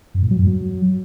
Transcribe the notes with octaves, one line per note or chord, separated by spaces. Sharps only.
F#2
A2
F#3
F#2
F#3